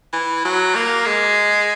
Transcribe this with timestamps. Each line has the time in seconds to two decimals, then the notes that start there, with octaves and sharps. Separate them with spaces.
0.13 E3
0.45 F#3
0.75 A#3
1.06 G#3